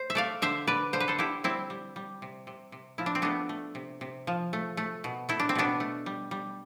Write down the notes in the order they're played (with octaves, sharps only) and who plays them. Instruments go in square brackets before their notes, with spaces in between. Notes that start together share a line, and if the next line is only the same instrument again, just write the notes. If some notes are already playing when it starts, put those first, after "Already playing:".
Already playing: [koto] C5
E5
A3 D5 F5
D3 C5 E5
D3 B4 D5
D3 C5
B4
A4 C5
D3 E4 G4
G3 C4 E4
G3
G3
C3
C3
C3
F3 E4
D4
C4
A3 B3 D4
A3
C3
C3
F3
A3
A3
B2
A3 E4
D4
C4
B2 B3 D4
A3
G3
G3